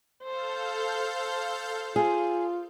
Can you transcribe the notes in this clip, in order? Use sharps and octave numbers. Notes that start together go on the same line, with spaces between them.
A4 C5 F5 G6
F4 G#4